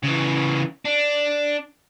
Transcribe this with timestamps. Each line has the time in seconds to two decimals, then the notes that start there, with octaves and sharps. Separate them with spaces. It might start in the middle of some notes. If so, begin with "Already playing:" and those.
0.03 C#3 E3
0.85 D4